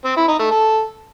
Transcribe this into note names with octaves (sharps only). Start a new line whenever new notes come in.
C4
E4
D#4
A3
A4